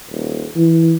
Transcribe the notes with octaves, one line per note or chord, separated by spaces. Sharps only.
D#1
E3